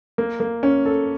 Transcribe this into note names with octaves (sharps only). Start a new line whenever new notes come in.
A#3
A#3
C#4
A4